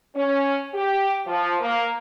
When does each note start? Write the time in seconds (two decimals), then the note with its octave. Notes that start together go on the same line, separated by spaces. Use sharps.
0.16 C#4
0.74 G4
1.27 F3
1.60 A#3